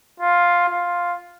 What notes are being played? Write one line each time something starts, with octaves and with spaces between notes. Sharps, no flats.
F4
F4